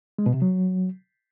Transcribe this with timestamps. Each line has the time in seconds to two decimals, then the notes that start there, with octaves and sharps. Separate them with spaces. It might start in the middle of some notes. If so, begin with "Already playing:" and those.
0.18 G#3
0.26 B2
0.34 C3
0.42 F#3